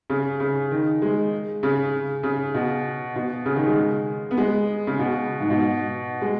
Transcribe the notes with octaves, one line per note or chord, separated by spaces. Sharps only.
C#3
C#3
D#3
G#3
C#3
C#3
B2
B2
C#3
D#3
G#3
B3
G#3
C#3
B2
G#2
B2
G#3